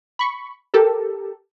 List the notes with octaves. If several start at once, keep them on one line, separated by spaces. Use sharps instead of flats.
B5 C#6
G4 A4 A#4